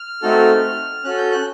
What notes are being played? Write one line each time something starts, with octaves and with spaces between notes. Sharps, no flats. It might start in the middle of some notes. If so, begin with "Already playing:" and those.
Already playing: F6
A3 C4 D#4 F#4 A4
C#4 F#4 A4 F#6
G6
F#6